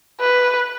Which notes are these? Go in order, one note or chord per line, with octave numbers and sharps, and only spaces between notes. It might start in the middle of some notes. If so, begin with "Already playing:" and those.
B4